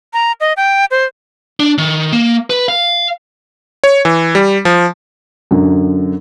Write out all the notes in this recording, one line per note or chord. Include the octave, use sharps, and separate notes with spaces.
A#5
D#5
G5
C5
D4
D#3
A#3
B4
F5
C#5
E3
G3
F3
F#2 D3